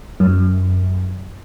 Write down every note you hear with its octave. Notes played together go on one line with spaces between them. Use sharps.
F#2